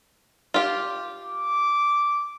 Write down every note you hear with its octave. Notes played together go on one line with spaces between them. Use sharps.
F4 G4
D6